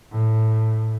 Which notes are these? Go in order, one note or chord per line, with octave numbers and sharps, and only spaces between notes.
A2